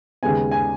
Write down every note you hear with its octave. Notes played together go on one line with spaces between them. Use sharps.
D#2 C#3 G#3 B3 G#5
G#5